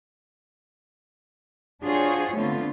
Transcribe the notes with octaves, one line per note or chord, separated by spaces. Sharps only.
D4 F4 F#4 G#4 C5 C#5
D3 A3 B3 C4 F4